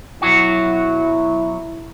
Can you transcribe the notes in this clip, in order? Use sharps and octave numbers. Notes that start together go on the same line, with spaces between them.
B1 F#3 E4 F#4